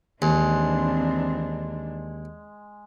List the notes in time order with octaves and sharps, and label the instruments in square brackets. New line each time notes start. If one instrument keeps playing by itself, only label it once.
[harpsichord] D#2 [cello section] E3 C4 D4 [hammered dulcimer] G#3